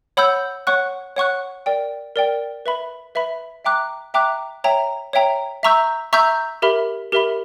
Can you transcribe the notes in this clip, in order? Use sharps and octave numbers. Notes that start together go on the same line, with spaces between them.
C#5 F#5 B5 E6 G6
C#5 F#5 C#6 F#6
C#5 F#5 C#6 F#6
A#4 D5 G5
A#4 D5 G5
B4 E5 B5
B4 E5 B5
E5 G5 A#5 D6 F#6
E5 G5 A#5 D6 F#6
C#5 E5 G5 A#5
C#5 E5 G5 A#5
E5 A#5 C#6 E6 G6
E5 A#5 C#6 E6 G6
G4 A#4 E5 B5
G4 A#4 E5 B5